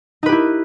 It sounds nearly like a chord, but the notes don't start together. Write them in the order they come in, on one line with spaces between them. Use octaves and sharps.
D#4 B4 G4 E4